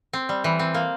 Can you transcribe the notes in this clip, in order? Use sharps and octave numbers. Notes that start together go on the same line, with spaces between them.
C4
G3
E3
C4
A#3